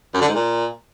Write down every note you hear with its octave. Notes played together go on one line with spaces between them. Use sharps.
F#2
D3
G#2
A#2